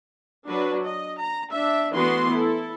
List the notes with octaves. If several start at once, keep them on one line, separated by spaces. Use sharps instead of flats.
F#3 D4 F#4 B4
D#5
A#5
D4 E5
E3 A3 B3 F#4 B4 C6
E4 A4